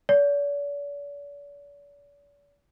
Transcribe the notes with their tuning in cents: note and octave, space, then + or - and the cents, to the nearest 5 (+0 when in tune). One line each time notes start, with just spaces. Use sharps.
D5 -45